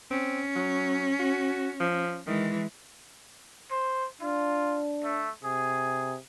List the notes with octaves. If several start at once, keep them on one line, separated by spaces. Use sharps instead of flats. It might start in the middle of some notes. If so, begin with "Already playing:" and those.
C4 C#4
F#3
F#4
F3
D#3 E3 G#3
C5
D4 F4
A3
C3 G#4